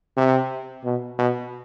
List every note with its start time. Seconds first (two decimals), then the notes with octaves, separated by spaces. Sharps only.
0.17 C3
0.85 B2
1.19 B2